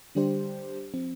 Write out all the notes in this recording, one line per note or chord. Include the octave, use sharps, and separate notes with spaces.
D3 G3 D4 G4 C5
F3 C4